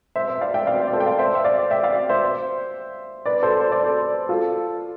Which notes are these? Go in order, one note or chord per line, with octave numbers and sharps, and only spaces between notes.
C5 E5
C5 E5
D5 F5
E5 G5
D5 F5
C5 E5
D5
A4 C5
G5
D5 F5
C5 E5
E5
D5 F5
E5 G5
D5 F5
C5 E5
B4 D5
A4 C5
C5
D5
A4 C5
F4 A4